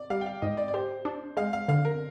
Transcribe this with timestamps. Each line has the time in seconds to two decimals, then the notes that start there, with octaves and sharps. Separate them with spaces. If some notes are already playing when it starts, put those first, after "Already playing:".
Already playing: D5
0.10 G3 F5
0.21 G5
0.26 F5
0.42 G#2 D#5
0.57 D5
0.68 D5
0.74 G4 C5
1.05 D4
1.37 G#3 F5
1.53 F5
1.68 D3 F5
1.85 A#4